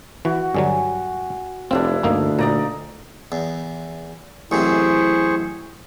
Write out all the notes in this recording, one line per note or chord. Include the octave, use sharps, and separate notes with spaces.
E3 F#4
G2 D3 F#3 G#5
F1 C4 D4 E4 F5
G1 D2 A#3 D#4
A#2 D#4 D5 A#5
E2
A1 F#2 C3 E4 G#4 C5 C#6